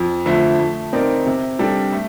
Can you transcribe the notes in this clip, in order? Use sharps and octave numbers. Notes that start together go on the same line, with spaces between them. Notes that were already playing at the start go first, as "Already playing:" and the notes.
Already playing: F2
D3 F3 A3
A3
C4 D#4 A#4 D5
C3
G3 D4 A4
A3